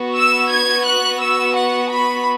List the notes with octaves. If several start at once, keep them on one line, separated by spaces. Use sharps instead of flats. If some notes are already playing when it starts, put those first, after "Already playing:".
Already playing: B3 F#4
E6
G#6
F#6
E6
F#5
B5